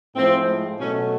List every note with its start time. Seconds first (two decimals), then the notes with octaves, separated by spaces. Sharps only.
0.15 A2 F3 G#3 C4
0.79 B2 F#3 A3 C#4